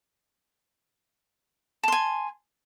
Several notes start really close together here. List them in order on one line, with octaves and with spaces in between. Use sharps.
A5 C6 G#5